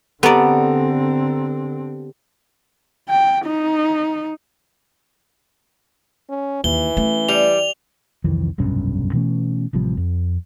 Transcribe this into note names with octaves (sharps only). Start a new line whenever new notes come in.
D3 B3 C4 G4 A4 D5 A#5
G5
D#4
C#4
D#2 E3 G7
A3 C#4
G3 F7
C2 F2 D#3 E3
F1 B1 G2 C#4
B2 E3 A3 C#4
A1 C3 F3 G3
F2